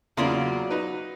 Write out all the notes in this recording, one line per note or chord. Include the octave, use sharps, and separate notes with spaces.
E2 C#3 F#3 A#3 F4 D5 C6
D#4 B4